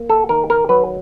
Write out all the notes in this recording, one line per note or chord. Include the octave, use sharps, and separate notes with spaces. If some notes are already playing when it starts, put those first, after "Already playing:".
Already playing: A#3
A4
D#3 A#4
A#4
F#3 B4